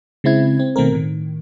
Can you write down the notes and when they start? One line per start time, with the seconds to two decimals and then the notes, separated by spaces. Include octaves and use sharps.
0.24 C#3 G#3 C4 E4 G#6
0.59 C4
0.76 B2 D#3 A3 C4 A#4
0.92 A2 D#3